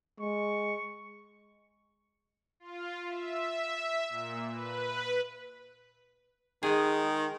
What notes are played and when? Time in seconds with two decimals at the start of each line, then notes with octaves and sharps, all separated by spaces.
0.20 G#3 C#6
2.60 F4
3.09 E5
4.09 A#2
4.50 B4
6.63 D#3 G#3 G#4